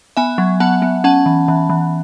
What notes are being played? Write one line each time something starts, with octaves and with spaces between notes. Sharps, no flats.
B3 E5 G#5
F#3
B3 F#5 A5
B3
C#4 F#5 A5
E3
E3
E3